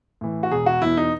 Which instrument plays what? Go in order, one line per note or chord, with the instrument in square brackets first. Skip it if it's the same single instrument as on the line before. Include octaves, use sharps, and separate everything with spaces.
[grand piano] A2 E3
F#4
E1 G#4
F#4
E2 B2 E4
D#4